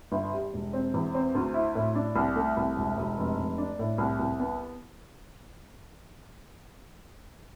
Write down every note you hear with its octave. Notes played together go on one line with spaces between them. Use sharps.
G1
G3
E1
C4
E2
C4
D2
E4
A2
D4
C2
A3
C2
E1
E1
F1
F1
D4
A2
C2
C2
B3